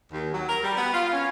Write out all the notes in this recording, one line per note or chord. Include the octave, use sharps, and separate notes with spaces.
D#2
F#3
A#4
G3
B3
F4
C#4